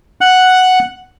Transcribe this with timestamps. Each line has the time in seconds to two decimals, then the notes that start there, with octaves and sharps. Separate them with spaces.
0.21 F#5 F#6